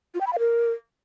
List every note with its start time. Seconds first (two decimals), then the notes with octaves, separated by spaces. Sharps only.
0.14 F4
0.21 G5
0.27 B5
0.33 F5
0.39 A#4